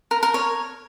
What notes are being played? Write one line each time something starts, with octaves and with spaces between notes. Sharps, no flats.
A#4
A#4
C#5